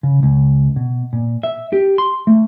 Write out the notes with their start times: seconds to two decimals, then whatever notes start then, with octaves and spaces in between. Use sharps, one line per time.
0.03 C#3
0.23 C#2
0.76 B2
1.13 A#2
1.43 E5
1.73 G4
1.98 C6
2.27 A3